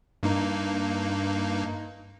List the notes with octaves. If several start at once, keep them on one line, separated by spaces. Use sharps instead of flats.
G2 A#3 D#4